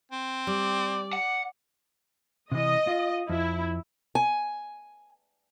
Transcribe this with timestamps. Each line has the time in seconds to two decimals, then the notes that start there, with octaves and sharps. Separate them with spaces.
0.12 C4
0.47 G3 D5
1.13 F#5
2.52 C3 E3 D#5
2.87 F4
3.29 F2 E4
4.15 G#5